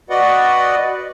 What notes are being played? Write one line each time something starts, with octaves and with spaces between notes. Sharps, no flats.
F#4 B4 D5 D#5 F#5